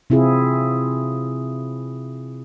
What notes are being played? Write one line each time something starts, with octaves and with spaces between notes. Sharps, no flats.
C3 C4 E4 F4 G#4